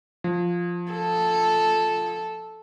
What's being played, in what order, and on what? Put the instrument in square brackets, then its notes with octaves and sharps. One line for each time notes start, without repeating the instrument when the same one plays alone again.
[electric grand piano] F3
[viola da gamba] A4